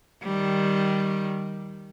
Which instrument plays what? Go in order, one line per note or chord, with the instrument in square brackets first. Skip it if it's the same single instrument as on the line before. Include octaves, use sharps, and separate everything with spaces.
[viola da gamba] D#3 G3